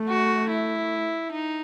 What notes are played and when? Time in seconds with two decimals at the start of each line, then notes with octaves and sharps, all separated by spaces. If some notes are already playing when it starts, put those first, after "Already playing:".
Already playing: A3
0.09 F#4
0.50 E4
1.31 D#4